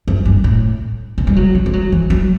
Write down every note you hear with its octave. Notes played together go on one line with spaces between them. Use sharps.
F#2
G2
A2
B2
G3
F#3
G3
G3
F#3
E3
F#3